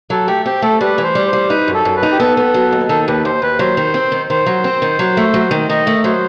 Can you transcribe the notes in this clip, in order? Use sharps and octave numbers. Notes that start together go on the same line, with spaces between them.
F#3 A4
A3 G4
C4 G4
A3 A4
G3 B4
E3
C5
G3
C5
G3
D#4 B4
F#2
A4
F#2
B4
D#4
G4
B3 A4
B3
F#3
D#2
D#3 A4
D#2 B4
D#2 C5
D#2 B4
F#3 C5
D#3
C4
D#3
D#3 C5
F#3
C4
D#3
F#3
A3
F#3
D#3
D#3 D#5
A3
F#3 C5